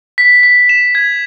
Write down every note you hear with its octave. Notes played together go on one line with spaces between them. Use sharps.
B6
B6
E7
G#6